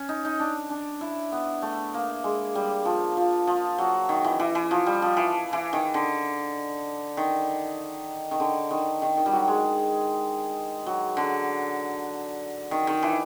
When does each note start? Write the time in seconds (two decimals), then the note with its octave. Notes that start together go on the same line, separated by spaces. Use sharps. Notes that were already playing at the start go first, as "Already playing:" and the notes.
Already playing: C#4
0.09 D#4
0.25 D#4
0.40 D4
0.70 D4
1.01 E4
1.32 B3
1.62 A3
1.94 A#3
2.24 G#3
2.55 G3
2.85 F3
3.17 F3
3.47 F3
3.78 F#3
4.09 D#3
4.24 E3
4.40 E3
4.55 E3
4.71 F3
4.86 G3
5.02 F3
5.17 E3
5.53 E3
5.73 D#3
5.94 D3
7.17 D#3
8.31 D#3
8.40 D3
8.71 D#3
9.02 D#3
9.17 D#3
9.26 G3
9.32 F#3
9.48 G#3
10.86 F#3
11.17 D3
12.71 D#3
12.87 D#3
13.03 E3